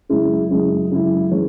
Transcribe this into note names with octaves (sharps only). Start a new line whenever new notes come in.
F#2 C#3 G#3 E4
F#2 C#3 G#3 E4
F#2 C#3 G#3 E4
C#3 E3 G#3 C#4